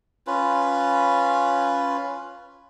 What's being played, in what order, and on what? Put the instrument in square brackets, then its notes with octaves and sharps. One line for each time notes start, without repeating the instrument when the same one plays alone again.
[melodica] C#4 F4 B4